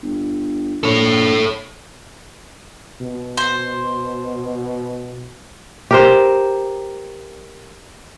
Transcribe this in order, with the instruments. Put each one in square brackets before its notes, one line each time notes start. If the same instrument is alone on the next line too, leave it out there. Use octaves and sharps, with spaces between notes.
[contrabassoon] G1
[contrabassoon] A#1 [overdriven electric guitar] A4 C#5
[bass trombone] B2
[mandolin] C5
[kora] G4 A#4 C5